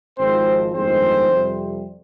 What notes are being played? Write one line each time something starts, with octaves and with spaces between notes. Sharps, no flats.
G#1 G#2 F3 G#3 C4 C5
G1 F2 D#3 G#3 C4 C5
F2 C3 G3